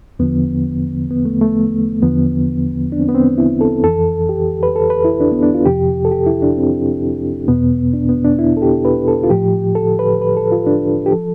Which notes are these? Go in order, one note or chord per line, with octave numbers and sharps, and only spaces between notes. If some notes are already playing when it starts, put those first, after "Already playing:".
E2 D3 F3 B3
B3
A3
A3
E2 D3 F3 B3
D4
C4
B3
C4
E4
A4
F2 E3 A4
G4
B4
A4
B4
E4
D4
B3
D4
F4
F2 C3 F3 G4
A4
G4
E4
D4
C4
E2 B2 B3
D4
B3
D4
E4
A4
G4
B4
A4
F4
A2 F3 G4
A4
B4
B4
A4
F4
D4
G4
F3 A4